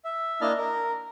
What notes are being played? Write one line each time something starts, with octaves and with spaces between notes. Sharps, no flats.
E5
A#3 D4 E4 D#5 A5 F6
A#4